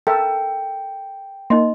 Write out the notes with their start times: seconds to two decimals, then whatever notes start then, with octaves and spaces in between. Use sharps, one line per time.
0.07 A4 A#4 E5 G5
1.50 A#3 D#4 D#5 C6